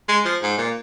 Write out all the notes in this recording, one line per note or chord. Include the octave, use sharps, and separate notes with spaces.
G#3
F3
G#2
A#2